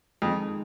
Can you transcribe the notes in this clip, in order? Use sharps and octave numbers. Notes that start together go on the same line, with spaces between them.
F2 D#3 G#3 D#4